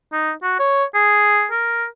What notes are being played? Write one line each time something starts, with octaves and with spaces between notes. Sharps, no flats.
D#4
F#4
C#5
G#4
A#4